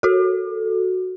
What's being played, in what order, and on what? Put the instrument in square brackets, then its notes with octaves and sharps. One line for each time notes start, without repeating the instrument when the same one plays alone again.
[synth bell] F#4 A4